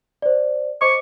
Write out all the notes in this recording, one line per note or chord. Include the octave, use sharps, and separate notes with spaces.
C5 D5
C5 D#5 C#6 D6